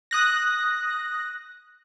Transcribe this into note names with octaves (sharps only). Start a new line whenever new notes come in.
D#6 F#6 A#6